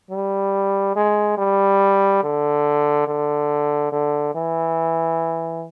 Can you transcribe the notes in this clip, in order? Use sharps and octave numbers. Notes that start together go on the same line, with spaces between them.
G3
G#3
G3
D3
D3
D3
E3